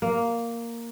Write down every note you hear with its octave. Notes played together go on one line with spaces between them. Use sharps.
A#3